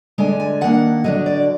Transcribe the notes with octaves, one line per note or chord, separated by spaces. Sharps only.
D3 G#3 D4 G#5
G#5
D#3 A#3 D4 F#5
D3 F#3 D4 D#5
D5